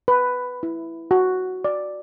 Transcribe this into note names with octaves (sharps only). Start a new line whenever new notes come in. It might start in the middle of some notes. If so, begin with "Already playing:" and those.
B4
E4
F#4
D5